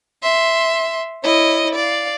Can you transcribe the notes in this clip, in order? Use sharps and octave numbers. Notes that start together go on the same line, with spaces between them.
E5 C6
E4 C#5 D#5
D5 F5